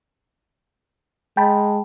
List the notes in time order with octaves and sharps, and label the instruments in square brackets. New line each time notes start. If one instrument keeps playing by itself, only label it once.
[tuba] G#3 [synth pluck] G5 A5 B5